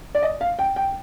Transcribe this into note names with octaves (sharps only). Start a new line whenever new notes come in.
D5
D#5
F5
G5
G5